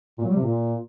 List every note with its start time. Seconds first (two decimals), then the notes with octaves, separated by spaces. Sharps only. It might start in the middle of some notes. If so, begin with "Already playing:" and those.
0.18 A#2
0.24 F#3
0.30 G3
0.36 C3
0.42 A#2